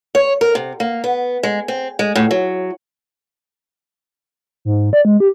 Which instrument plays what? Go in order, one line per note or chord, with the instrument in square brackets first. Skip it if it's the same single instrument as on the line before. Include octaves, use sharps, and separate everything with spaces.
[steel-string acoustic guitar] C#5
A#4
C3
A#3
B3
G#3
C4
G#3
A2
F#3
[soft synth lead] G#2
D5
G#3
G4